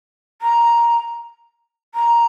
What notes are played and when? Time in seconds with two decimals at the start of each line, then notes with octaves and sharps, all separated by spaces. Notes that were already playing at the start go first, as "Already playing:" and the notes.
0.42 A#5
1.95 A#5